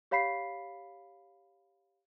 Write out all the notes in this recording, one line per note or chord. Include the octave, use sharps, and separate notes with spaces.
G4 C#5 F5 B5 B6 C7